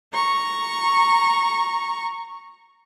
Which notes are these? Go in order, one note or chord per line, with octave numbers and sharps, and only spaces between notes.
A#5 C#6